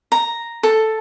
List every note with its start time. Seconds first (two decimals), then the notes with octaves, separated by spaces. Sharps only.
0.12 A#5
0.63 A4